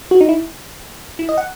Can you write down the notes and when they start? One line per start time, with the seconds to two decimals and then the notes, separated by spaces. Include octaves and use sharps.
0.11 F#4
0.21 D#4
0.29 E4
1.19 E4
1.29 D#5
1.38 F#5